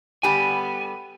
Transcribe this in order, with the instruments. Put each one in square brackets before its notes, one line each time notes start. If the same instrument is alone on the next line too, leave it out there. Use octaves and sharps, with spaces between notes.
[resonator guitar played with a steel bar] D3 G3 G4 [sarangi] B3 [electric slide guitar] G#5